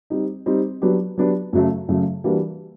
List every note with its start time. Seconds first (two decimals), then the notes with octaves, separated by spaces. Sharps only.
0.10 G3 C4 D#4
0.46 G3 C4 D#4
0.82 F#3 B3 D4 G4
1.18 F#3 B3 D4 G4
1.53 F#2 C#3 F#3 A3
1.88 F#2 C#3 F#3 A3
2.24 E3 G3 A#3 D4 F#4